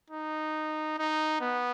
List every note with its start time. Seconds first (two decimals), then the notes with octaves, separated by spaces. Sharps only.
0.11 D#4
0.98 D#4
1.41 B3